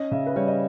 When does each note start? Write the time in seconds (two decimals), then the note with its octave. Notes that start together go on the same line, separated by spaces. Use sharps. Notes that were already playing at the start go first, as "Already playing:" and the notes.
Already playing: C#4 D#5
0.11 C#3 E5
0.26 B4
0.36 G3 C#5
0.48 D#5